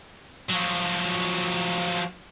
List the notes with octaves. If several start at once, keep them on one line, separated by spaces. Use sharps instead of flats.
F3 F#3